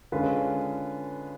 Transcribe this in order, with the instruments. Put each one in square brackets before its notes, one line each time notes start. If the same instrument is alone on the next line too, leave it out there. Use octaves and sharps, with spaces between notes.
[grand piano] D3 G#3 C#4 F4 B4